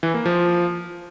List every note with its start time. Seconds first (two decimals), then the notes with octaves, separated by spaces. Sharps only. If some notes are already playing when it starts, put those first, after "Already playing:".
0.03 E3
0.14 A#3
0.26 F3